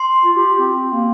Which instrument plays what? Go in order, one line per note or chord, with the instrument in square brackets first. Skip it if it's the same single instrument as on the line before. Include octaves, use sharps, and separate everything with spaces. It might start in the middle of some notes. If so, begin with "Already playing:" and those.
Already playing: [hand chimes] C6
[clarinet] F4
G4
C4
A#3